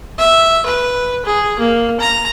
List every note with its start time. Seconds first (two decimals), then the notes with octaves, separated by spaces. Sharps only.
0.18 E5
0.66 B4
1.25 G#4
1.59 A#3
2.00 A#5